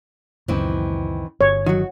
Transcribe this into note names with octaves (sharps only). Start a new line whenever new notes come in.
C#2 F#2 A#2 D#3 E3 C4
G1 C#5
D#3 F#3 F#4